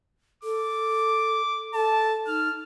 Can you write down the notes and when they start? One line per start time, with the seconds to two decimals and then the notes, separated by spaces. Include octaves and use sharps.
0.44 A4 D6
1.74 A4 A5
2.27 D#4 F6